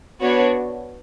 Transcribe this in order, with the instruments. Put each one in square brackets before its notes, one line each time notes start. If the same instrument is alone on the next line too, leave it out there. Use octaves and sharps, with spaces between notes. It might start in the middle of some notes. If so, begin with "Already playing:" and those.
[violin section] B3 D4 F#4 C#5